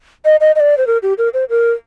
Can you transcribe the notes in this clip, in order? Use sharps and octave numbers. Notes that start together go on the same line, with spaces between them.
D#5
D#5
D#5
D5
C5
A#4
G4
A#4
C5
A#4